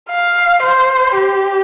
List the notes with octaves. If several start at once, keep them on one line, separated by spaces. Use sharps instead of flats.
F5
C5
G4